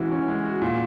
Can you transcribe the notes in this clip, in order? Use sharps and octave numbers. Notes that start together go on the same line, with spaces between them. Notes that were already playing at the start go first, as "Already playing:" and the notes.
Already playing: E3 G#3 C#4 F#4
C#4
G#3
F#4
A#2